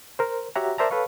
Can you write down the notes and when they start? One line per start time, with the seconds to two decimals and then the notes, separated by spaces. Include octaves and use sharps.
0.19 A#4 C5
0.56 F#4 G4 C#5 E5 F#5 A#5
0.78 A#4 C5 D5 E5 A5 A#5
0.91 A4 B4 C#5 F5 C#6